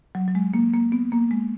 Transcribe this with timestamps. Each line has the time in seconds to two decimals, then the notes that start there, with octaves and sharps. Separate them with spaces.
0.15 F#3
0.28 F#3
0.35 G#3
0.54 A#3
0.74 A#3
0.92 B3
1.12 A#3
1.31 G#3